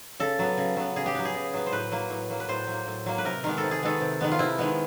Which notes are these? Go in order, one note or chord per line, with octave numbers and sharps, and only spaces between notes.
C#3 A4
F#3 B3
C#3
F#3 B3
C#3 G#4
G4
F#3 B3
G#4
C#3
F#3 B3
C5
A2 B4
F#3 A#3
A2
F#3 A#3
B4
A2 C5
F#3 A#3
A2
F#3 A#3
B4
C3 A#4
D#3 G#3 B3 A#4
A4
C3
G#4
D#3 G#3 B3 A4
C3
D#3 G#3 B3
F4
C3 E4
D#3 G#3 B3